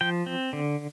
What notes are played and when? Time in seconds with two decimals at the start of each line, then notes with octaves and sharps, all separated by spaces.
0.01 F3 G5
0.26 C4
0.53 D3